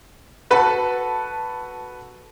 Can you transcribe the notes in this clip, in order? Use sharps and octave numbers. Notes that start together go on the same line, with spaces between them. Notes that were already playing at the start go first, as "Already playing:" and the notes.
F#4 A4 B4 A5 B5